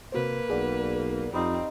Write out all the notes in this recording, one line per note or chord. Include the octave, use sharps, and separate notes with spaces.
C3 A#3 F#4 B4 C5
B1 G#4 D5 F#5
F2 G3 C4 D#4 F5